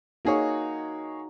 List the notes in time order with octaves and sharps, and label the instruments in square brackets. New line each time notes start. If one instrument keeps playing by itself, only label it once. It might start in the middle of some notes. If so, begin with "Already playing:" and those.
[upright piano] A#3 G#4 C#5 [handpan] D#4 F#4